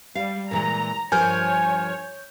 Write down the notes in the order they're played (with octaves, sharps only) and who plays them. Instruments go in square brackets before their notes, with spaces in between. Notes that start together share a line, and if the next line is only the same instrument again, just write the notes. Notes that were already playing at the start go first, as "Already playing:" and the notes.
[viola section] G3 [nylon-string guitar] F5
[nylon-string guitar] A#2 E3 G#3 [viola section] A#5
[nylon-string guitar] G2 F3 A#4 [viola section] C#5 [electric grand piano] G#5 F6 G6